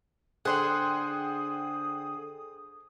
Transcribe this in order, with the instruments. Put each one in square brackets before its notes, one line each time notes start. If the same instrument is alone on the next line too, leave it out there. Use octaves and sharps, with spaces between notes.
[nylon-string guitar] D3 [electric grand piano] G#4 C5 G5 [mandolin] F#5 C6 [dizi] D#6